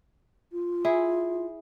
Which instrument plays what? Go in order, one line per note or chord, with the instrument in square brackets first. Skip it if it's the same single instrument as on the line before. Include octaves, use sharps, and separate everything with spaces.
[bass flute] F4
[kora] E4 G#4